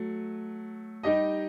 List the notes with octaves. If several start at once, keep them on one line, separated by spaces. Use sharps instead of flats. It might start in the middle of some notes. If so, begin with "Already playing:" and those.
Already playing: F#3 A3
G3 D#4 G4 D#5